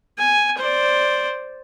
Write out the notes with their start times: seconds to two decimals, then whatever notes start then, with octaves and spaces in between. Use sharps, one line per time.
0.18 G#5
0.58 C5 D5